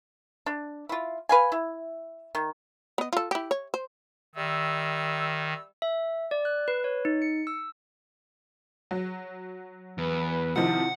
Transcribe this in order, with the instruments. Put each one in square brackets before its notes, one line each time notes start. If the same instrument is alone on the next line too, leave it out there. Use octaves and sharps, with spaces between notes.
[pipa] D4
E4 F4
B4 F5 G#5
E4
D#3
[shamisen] B3 D#5
F4 A4
E4 G4
C#5
C5
[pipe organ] D#3 [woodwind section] G3 E5 E6
[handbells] E5
D5
F#6
B4
C#5
D#4
C#7
E6
[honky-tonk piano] F#3
[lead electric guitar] E2 [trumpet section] B4
[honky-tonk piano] C3 D#3 F3 [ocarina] E4 [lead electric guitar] F#5